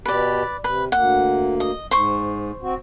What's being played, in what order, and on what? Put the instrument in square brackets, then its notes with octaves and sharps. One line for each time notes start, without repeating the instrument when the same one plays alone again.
[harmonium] B2 G4 [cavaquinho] B4 D5
[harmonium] C3 [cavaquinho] B4
[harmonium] D2 A#3 [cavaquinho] F#5
[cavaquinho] D#5
[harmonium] G#2 [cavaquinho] C5 C#6
[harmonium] C4 F#4